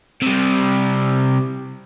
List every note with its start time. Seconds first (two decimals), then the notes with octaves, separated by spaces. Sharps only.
0.22 C3 G3